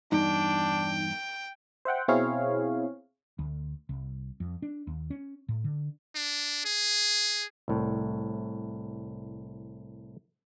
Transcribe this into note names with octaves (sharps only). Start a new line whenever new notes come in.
E2 G2 D4 D#4 G5
C5 E5 F#5 G5
B2 C4 E4 G#4 C#5 F5
D2
C2
F2
D4
D#2
C#4
A2
D3
D4
G#4
C2 A2